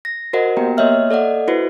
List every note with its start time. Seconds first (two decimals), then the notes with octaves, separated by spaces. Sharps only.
0.05 A#6
0.33 F#4 A#4 C5 D#5 F#5
0.57 A#3 B3 G4 G5 A#5
0.77 A#3 C#5 D#5 E5 F6
1.11 A4 D5 D#5 F#5
1.48 E4 F#4 B4 C5